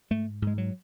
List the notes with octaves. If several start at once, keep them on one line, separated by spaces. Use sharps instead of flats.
G#2 A3
G#2
G#3
F#3